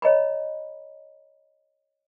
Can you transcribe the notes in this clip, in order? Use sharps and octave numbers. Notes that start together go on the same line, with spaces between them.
C#5 D#5 A#5 B5